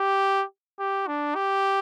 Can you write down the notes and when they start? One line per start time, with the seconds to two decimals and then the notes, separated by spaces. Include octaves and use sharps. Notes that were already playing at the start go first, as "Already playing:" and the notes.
Already playing: G4
0.79 G4
1.07 D4
1.35 G4